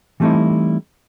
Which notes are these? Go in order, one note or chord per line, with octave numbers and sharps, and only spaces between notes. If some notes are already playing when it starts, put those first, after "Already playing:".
E3 G3 A3 C4 D#4 E4